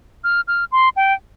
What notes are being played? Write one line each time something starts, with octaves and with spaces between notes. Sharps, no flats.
F6
F6
C6
G5